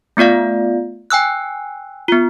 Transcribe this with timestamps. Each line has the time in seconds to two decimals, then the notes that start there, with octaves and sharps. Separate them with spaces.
0.17 A3 B3 F4 D5 F5
1.10 G5 G#5 E6 F#6
2.08 B3 F4